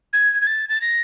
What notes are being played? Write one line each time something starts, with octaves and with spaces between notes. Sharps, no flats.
G#6
G#6
A6
A6
A#6